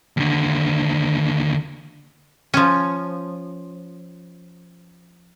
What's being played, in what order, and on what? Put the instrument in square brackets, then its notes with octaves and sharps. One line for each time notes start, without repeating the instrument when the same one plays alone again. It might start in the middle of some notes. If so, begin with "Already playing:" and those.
[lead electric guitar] D#2 D3
[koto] F3 C#4